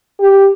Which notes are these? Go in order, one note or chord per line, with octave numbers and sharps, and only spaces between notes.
G4